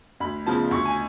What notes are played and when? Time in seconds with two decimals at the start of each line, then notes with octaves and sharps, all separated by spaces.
0.20 D2 B5
0.46 C#3 F3 B3 A5
0.71 D2 C#6
0.85 G#5